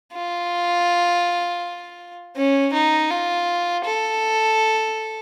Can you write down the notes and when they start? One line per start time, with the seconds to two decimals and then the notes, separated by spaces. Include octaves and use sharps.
0.13 F4
2.37 C#4
2.74 D#4
3.10 F4
3.85 A4